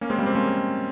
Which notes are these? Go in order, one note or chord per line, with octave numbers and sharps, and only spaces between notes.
A#3 C#4
G#3 C4
G3 A#3
G#3 C4
A#3 C#4